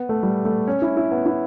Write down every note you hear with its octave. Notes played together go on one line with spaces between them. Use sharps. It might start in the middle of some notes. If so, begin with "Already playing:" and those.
Already playing: B3
A3
G3
A3
C#4
E4
E4
B3
E4